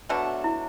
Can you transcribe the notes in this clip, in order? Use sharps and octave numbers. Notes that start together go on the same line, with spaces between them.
B2 F#3 A3 D4
E4